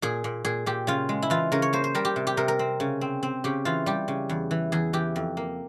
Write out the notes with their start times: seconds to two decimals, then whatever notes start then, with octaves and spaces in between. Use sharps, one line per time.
0.02 A#2 G#4
0.24 A#2
0.45 A#2 G#4
0.66 A#2 G4
0.87 C#3 F4
1.09 G#3
1.22 E4
1.30 E3 F4
1.52 C#3 A#4
1.62 C#5
1.73 A#3 C5
1.84 C5
1.95 G3 A#4
2.05 G4
2.16 C3
2.27 G4
2.37 C3 A#4
2.48 A#4
2.59 C4
2.80 C#3
3.01 C4
3.23 C4
3.44 C#3 G4
3.65 E3 F4
3.86 G3 G4
4.08 C#3
4.29 E2
4.51 E3
4.72 E2 G#4
4.93 E3 G4
5.16 F2
5.37 A#3